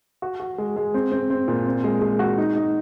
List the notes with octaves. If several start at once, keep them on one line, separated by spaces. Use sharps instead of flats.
F#4
F#4
G#3
G#3
C4
C4
C4
A#2
C4
G#3
G#3
F#4
D#4
D#4